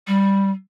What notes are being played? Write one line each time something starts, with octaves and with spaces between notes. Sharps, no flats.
G3